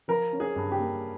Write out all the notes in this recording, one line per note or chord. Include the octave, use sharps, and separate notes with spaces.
F3 A#4
C#4
G#4
G2
G4
A#3